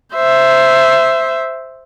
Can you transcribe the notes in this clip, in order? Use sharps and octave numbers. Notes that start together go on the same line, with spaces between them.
C5 E5